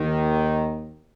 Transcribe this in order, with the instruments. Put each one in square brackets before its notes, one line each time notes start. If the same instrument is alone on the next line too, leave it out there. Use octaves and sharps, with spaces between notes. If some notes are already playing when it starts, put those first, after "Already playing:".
Already playing: [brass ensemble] D#2 D#3